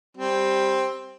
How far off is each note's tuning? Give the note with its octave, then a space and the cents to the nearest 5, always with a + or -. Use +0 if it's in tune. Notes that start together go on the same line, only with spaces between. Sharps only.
G3 +0 C4 +10